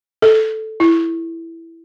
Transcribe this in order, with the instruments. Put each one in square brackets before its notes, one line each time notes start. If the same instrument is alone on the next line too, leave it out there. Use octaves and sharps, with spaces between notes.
[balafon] A4
E4